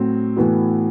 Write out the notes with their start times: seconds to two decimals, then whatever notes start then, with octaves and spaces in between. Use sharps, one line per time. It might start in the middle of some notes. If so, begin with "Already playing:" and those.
Already playing: A2 F#3 C4
0.37 A2 E3 B3 F#4